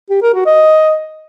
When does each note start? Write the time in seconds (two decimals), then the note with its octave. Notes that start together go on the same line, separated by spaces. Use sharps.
0.10 G4
0.22 A#4
0.34 F#4
0.46 D#5